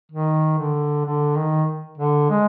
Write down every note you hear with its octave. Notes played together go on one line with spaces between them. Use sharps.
D#3
D3
D3
D#3
D3
G#3